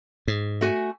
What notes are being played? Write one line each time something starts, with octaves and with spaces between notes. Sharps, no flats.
G#2
A3 F#4 G#5